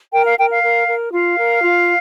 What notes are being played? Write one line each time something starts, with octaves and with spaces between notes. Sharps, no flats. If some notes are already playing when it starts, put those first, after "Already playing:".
A#4 G5
F5
A#4 G5
F5
A#4
A#4
F4 F5
A#4
F4